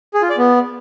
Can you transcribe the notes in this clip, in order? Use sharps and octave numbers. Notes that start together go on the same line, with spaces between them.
G#4
F4
D5
B3